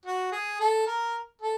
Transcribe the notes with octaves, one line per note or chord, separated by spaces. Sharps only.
F#4
G#4
A4
A#4
A4